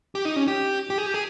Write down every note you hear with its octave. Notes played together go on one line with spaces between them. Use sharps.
G4
D#4
C#4
G4
G4
G#4
G4
G#4